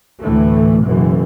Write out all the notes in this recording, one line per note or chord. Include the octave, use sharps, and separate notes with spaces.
D2 A2 E3 A3
F#1 F#2 B2 E3